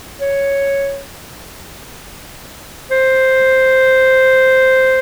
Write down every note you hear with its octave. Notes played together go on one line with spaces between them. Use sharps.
C#5
C5